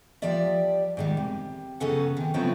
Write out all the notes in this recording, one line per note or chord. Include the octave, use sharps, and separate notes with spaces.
F3 G3 G4 D5 E5
G#2 D#3 G3
C3
F#2 C#3 B3 C#4 A4 F#5
C3 D#3
C#3 F3 F#3 A3 B3 C4